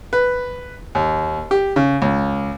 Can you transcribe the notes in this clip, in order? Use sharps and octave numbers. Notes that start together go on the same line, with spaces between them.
B4
D#2
G4
C#3
C#2